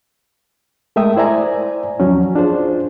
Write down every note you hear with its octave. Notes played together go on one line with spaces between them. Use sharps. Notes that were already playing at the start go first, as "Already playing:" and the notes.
G#3 A3 A#4 E5 G5 D#6
E4 C5 D5 E5 G#5 A#5
D#2 F3 F#3 C#4
D4 F4 G#4 C5